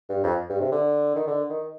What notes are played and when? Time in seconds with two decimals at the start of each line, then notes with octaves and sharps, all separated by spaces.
0.09 G2
0.23 F2
0.50 G2
0.60 C3
0.72 D3
1.16 D#3
1.27 D3
1.50 D#3